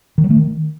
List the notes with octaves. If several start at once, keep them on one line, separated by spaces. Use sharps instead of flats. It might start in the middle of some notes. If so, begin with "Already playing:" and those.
D#3
F#3
A3
D#3